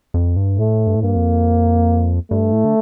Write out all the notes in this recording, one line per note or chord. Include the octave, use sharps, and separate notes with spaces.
F2
G2
A2 A3
G2
A2
G2 A#3
F2
G2 A3
A2
D3